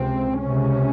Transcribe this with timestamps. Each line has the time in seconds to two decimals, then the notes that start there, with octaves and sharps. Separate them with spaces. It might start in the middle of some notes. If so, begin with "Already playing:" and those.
Already playing: C#2 C3 C4
0.43 C#2 C3 C#4